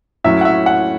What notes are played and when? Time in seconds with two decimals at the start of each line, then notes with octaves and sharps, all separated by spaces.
0.24 A2 F#3 C#4 E5
0.41 F#5
0.45 E5
0.66 F#5